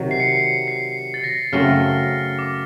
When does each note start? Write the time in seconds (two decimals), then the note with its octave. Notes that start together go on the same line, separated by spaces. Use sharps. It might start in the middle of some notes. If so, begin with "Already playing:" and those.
Already playing: C3 D#3 F#3
0.11 C7
0.20 C#7
0.29 C7
0.40 C#7
0.68 C7
1.14 A6
1.24 A#6
1.53 F#2 C#3 F#3 A3 C4 F6
2.39 D6